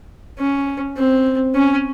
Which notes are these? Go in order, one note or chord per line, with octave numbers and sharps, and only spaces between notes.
C#4
C4
C#4